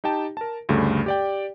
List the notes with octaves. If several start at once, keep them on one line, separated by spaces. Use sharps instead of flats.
D#4 G4 G5 A5
A#4 A5
D2 G2 C#3 A3
G4 D5 G5